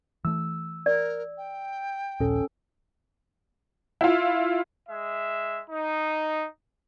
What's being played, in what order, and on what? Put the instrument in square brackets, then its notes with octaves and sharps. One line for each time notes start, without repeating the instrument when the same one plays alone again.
[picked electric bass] E3 A3 [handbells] E6
[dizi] A#4 [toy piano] D5
[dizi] G5
[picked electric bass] D#1 A#1 [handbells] C#4 A4
[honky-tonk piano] E4 F4
[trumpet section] G#3 E5
D#4